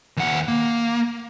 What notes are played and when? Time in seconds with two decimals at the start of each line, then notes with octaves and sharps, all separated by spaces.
0.17 D#2 F#5
0.48 A#3